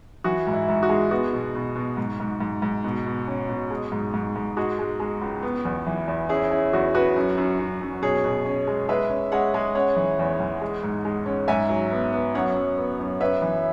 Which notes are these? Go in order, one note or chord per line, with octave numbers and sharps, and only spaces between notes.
E3 F#4
G#2
E4
G#2
F#4
G#3
B3 F#4
B2
B2
B2
G#2
G#2
G#2
G#2
B2
B2
C#4
B2
G#3
G#2
G#2
G#2
G#3 F#4
G#3
G#3
C#2
B3
E2
E3
E2
C#4 E4 G#4
C#4 E4
E2 F#4
C#4 F#4 B4
F#2
F#2
F#2
F#2
B2 G#4 C#5
B2
C#4
G#3
G#3 B4 E5
C#4
G#3 C#5 F#5
G#3
C#4 C#5 F#5
E3
E2
E2
G#3
G#2
G#3
C#4
G#2 E5 G#5
F#3
B3
B3
F#2 C#5 F#5
F#2
B3
F#2
C#4 B4 E5
E3